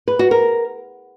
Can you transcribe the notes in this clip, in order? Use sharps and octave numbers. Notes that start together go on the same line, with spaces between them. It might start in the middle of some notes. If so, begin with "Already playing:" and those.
B4
F#4
A#4